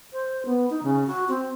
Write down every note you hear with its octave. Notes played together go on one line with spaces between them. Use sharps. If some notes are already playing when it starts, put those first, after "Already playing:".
C5
B3
D#4
C#3
F#4
C4